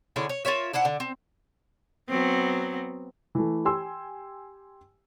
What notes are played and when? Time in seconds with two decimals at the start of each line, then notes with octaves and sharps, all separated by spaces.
0.16 D3 C#4 E4 G#4
0.29 C#5
0.45 F4 A#4 C#5 E5
0.73 D4 E4 C5 F#5
0.85 D3
1.00 C4
2.09 F#3 B3 C4
3.35 E3 A3
3.65 G4 G5 G#5 C6 E6